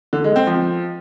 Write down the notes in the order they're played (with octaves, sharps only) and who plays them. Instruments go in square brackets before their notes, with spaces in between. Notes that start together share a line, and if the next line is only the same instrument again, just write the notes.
[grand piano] D3
G#3
C4
F3